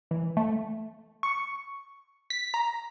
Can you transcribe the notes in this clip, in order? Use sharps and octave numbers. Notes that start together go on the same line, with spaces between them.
E3
A3
C#6
B6
A#5